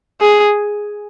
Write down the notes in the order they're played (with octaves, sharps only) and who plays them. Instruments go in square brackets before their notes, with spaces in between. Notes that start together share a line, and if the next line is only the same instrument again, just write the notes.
[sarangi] G#4